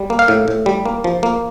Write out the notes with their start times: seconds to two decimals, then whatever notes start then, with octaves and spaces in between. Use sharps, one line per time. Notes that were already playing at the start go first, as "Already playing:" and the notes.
Already playing: G3
0.10 A#3
0.19 F5
0.28 A2
0.48 A2
0.66 G3
0.86 A#3
1.04 F3
1.23 A#3